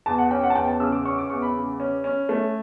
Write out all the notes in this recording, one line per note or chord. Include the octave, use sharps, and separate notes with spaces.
E2 A5
F#5
C#4 G5
F#5
A5
E2 G5
A5
C#3 E6
D6
C#4 C#6
D6
E2 C#6
B5
C#3
C#4
C#4
A3